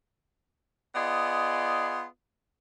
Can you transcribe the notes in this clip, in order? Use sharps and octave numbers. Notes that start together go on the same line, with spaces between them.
B3 F4 G#4 D5 D#5